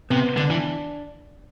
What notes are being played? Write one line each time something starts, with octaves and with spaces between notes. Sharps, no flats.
C3 B3
D3 D4
E3